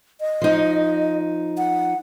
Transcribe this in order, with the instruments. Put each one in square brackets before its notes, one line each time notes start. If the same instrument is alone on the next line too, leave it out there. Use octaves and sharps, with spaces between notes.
[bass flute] D#5
[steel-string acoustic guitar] F3 D#4
[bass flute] F#5